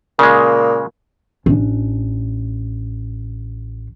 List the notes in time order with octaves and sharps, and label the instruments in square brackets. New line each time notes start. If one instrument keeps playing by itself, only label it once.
[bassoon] A#2 [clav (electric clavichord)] C#3 G#3
[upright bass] A1 D4